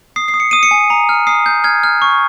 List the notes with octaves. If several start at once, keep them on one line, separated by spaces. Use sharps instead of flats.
D#6 C7
C7
D#6
C#7
D#6 D#7
C#7
G#5
A#5
F6
D#6 C7
G6
F6 G#6
F6
C#6